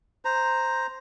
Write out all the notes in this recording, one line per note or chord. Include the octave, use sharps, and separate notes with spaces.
C5 A#5